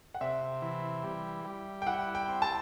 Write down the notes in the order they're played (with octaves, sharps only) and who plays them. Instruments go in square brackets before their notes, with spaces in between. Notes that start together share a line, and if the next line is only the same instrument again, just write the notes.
[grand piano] F#5
[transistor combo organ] C3 [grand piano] E5
[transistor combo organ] E3
G3
G3
[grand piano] G5
[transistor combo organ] E4 [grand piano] F#5
[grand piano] G5
[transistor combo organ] C4
[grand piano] A5